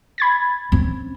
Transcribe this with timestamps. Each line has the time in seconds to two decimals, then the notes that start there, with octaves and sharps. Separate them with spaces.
0.18 B5 G#6 A6
0.72 C4 C#4